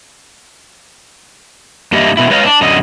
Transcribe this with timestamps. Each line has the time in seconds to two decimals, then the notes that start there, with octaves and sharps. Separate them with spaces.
1.92 G2 A#3 G4 D#5 E5
2.17 B2 E4
2.30 G#3 B4 C#5 D#5 F5
2.46 D4
2.61 F#2 D3 D#5